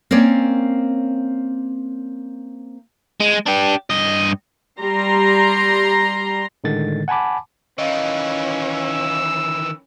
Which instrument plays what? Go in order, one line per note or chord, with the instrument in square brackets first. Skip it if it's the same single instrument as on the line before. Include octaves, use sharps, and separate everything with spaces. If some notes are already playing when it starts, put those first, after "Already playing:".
[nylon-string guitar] A#3 C4 C#4 C#5 D5
[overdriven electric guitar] G#3
D4 G4
G2 D#5
[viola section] G3 A#5 C6
[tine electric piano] A2 D3 D#3 G#3 A6
F#5 G#5 A5 B5 D6
[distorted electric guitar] D#3 E3 [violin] C#4 [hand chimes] D#5 F5
[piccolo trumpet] E6